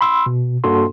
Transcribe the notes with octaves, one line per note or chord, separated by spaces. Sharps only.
B5 C6 E6
B2
G2 A#3 D4 F#4 A4 C6